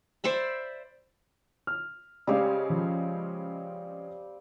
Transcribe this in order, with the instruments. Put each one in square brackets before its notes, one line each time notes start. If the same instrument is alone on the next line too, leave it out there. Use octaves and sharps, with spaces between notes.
[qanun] C5 D5 E5 B5
[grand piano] F6
[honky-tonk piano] C#3 G#3 C#4 [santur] G3 C4 F5
[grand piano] F3